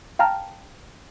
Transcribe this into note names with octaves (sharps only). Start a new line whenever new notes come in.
F5 G5 A5 A#5 F6